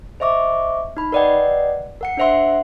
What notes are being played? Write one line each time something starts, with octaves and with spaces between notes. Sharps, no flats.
C5 D#5 E5 C#6 D6
D#4 B5
A#4 B4 D5 D#5 F#5 G5
A#4 F#5 C#7
D4 A#4 C5 E5 F#5 C6